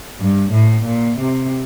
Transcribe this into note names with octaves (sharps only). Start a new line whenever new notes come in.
G2
A2
A#2
C3